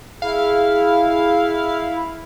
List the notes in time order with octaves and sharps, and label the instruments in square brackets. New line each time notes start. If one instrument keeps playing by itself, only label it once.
[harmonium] E4 [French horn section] G#4 [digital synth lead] F5